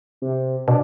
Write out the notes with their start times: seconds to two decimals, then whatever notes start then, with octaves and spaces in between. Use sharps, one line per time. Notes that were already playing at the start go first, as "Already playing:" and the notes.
0.22 C3
0.68 B2 D4